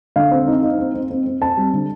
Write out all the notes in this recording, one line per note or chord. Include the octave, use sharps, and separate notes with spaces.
D3 F5
C4
D#4
D#4
C4
C4
C4
C4
C4 A5
G3
D3